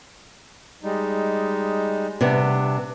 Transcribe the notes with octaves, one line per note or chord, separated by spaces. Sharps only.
G3 G#3 D#4
C3 G3 B3 D4